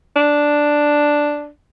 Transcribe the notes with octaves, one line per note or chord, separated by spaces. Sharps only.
D4